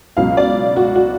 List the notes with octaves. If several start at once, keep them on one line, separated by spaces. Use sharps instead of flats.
C#2 B2 F#3 F5
D5
F#4
F#4